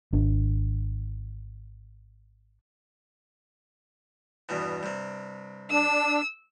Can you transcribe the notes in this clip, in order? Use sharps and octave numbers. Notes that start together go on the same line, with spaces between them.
G#1 D4
E2 G2 B2
G2 C3
D4 E6